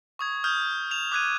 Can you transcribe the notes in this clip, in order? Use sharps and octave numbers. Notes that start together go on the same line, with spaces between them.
C#6 D#6 G#6
D#6 F6 G6
E7 F7
D6 F#6 G#6 D#7